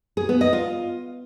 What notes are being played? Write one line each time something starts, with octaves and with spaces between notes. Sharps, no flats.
G#4
B3
D#5
F4